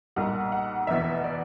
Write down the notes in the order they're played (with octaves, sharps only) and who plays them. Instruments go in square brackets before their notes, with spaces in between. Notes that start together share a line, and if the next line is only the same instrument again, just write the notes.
[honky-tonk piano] B1 A#2 G3 F#5
F#5
F1 E2 B2 E5
D5